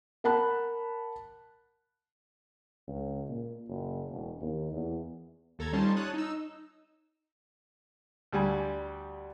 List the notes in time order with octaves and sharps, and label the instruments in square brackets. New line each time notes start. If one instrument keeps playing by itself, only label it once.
[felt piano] A#4 F#5 A5 B5 F#6
[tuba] C#2
A#2
F#1
E1
D#2
E2
[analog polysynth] D#2 A4 A#5 G#6
G3 C#4 D#4 F4 C5 A5
C#5 A5 D#6 F#6
D#4 E6
[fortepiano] D2 G3 G#5